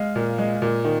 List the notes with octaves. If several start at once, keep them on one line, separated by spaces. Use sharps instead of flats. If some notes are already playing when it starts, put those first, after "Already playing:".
Already playing: G#3 F5
A#2
G#3
A#2
D#3